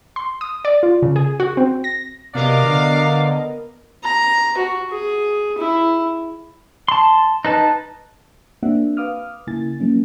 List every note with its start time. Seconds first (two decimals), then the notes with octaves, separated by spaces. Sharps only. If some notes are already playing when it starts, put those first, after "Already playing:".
0.16 C6
0.41 D#6
0.65 D5
0.83 F4
1.02 C#3
1.16 G#4
1.40 F#4
1.57 C4
1.84 A#6
2.35 C3 F#3 B3 A#4 D5 D#5 F5 D6
2.63 D3
4.03 A#5
4.58 F#4
4.90 G#4
5.58 E4
6.88 A5 C6
7.45 D#4 B4 A5
8.63 A#3 C4 D4 F#4 E5 F#5
8.97 B4 F5 D6 D#6 F6
9.47 C#3 A#3 E4 G#5 A6
9.80 F3 F#3 A#3 C#4